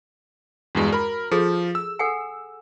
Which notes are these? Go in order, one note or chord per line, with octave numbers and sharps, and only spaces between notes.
E2 G2 G#3 F#4
A#4 B5
F3 G#4 A4
E6
A4 F#5 G#5